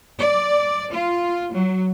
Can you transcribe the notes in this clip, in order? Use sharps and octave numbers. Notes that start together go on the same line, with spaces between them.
D5
F4
F#3